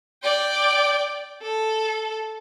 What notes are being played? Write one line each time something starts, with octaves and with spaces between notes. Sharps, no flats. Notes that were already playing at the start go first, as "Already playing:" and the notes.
D5 G5
A4